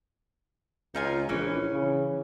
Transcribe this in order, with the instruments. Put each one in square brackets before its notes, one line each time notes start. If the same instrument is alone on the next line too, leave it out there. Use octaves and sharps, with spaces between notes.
[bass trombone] C#2 [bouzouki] D#4 F4 G#5
[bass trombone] A#1 [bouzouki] E3 C#4
[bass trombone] C#3